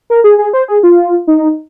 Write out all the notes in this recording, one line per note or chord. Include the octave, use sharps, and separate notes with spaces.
A#4
G#4
G#4
C5
G#4
F4
D#4